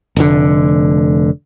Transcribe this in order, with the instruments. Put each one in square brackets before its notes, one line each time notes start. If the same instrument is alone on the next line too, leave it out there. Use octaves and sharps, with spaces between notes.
[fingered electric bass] F1 D3